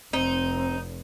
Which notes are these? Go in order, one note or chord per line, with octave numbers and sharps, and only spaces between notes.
F1 C4 D#4